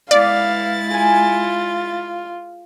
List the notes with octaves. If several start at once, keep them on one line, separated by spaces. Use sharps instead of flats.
G#3 B3 E4 D5 F5 A6
F4 G#4 G#5